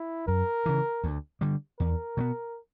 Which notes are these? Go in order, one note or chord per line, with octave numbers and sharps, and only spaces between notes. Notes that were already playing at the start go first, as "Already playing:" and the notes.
Already playing: E4
F#2 A#4
C#3 E3
D2
D3 G3
E2 A#4
B2 F#3 B3